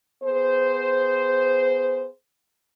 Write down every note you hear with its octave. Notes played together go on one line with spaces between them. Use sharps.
B3 G#4 C5